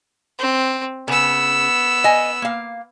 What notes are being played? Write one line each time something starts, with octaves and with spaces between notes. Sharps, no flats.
C4
C#3 B3 E6
D#5 G#5
A#3 F5